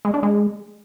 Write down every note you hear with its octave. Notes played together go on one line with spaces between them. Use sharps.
G#3
D4
G#3